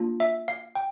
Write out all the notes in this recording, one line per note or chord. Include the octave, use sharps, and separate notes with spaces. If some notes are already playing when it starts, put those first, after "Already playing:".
Already playing: A#3 D4 F4
E5
F5
G5